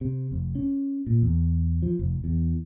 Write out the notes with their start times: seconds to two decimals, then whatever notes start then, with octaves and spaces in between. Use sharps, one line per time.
0.01 C3
0.31 F1
0.55 C#4
1.07 A#2
1.22 E2
1.82 F3
1.99 F1
2.24 E2